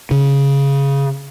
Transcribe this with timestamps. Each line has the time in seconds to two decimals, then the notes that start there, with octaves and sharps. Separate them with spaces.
0.11 C#3